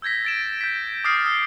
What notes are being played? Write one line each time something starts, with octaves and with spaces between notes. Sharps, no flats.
E6 G6 G#6 A#6 B6
A6 D7 E7
G6 B6
D6 D#6 F6 A6 C7 D7
D#6 E6